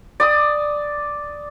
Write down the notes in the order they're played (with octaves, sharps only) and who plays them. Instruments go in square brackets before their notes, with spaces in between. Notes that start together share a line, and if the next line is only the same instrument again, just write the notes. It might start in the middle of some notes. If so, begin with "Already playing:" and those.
[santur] D5 D#6